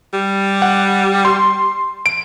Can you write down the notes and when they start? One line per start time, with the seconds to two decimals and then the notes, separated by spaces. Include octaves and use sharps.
0.13 G3
0.62 F#5
1.25 C6
2.06 D7